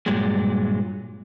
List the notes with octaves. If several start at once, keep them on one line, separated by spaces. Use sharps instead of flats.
G2 A#2 F#3 G#3